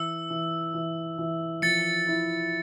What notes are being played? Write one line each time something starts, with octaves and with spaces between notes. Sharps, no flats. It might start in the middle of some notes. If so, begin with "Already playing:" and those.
Already playing: E3 E6
E3
E3
E3
F3 A6 C#7
E4